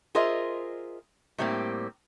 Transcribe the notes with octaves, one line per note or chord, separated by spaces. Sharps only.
F4 G#4 A#4 C5 D#5 E5
A2 G3 A#3 C4 G4